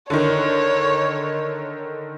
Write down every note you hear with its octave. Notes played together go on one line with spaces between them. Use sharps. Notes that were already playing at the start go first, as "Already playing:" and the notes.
D3 D#3 C#5